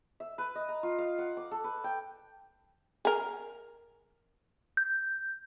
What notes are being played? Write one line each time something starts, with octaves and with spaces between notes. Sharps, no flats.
E5
B4
D#5
A#5
F4
F5
F#5
D6
A4
B4
G5
G#4 A#4
G6